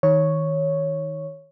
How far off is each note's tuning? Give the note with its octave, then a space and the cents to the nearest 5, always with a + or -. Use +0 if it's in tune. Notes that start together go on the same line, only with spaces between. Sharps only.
D#3 +25 C#5 +0